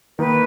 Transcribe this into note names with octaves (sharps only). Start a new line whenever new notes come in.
D#3 A#3 D#4 B4